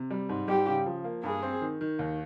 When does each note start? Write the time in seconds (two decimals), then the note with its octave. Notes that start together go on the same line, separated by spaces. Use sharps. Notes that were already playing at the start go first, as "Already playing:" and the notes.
Already playing: C3
0.10 G3
0.29 G#2
0.48 G3 G4
0.67 C#3
0.86 F3
1.04 A#3
1.23 G2 G#4
1.43 C4
1.61 D#3
1.81 D#3
1.99 D#2